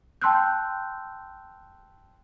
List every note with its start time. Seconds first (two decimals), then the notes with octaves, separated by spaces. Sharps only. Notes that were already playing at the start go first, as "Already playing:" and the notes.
0.21 G5 A5 C6 E6 F#6 G6